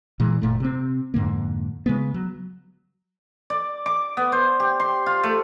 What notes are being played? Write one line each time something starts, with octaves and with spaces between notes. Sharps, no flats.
A#2 E3 G#3
F#1 A#2 A3
C3 C4
F2 G#2 D3 A#3
C#3 G#3 B3
F#3
D5
D6
B3
C5
G4
C6
F4
A3